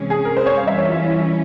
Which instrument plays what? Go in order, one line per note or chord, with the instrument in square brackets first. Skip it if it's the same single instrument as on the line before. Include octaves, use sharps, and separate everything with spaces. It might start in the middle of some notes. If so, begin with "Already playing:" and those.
Already playing: [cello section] C3 E3 G#3 C#4
[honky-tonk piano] G#4
A#4
C5
C#5
[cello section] E3 G3 C#4 [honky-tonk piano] F5
[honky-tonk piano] E5
C#5
F4
E4
E4